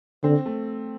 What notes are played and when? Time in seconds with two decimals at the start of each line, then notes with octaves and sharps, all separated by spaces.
0.23 D3 C4
0.46 A3